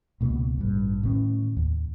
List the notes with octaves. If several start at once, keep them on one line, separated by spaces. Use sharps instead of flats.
C#2 B2 A#3
A1 G2
A2 D#3 B3 C#4
D#2